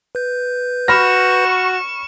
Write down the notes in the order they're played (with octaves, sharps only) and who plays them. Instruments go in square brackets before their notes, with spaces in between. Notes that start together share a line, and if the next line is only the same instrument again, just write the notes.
[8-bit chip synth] B4 G6
[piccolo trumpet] F#4 [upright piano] B5 F6 A#6 [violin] C#6 E7